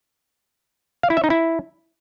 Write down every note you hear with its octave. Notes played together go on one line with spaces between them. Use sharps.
F5
E4
E5
D#4
E4